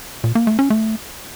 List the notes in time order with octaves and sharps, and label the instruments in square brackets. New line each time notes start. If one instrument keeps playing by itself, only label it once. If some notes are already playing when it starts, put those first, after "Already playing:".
[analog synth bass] A#2
A#3
A3
C#4
A3